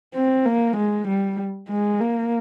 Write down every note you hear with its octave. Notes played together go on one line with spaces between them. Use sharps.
C4
A#3
G#3
G3
G#3
A#3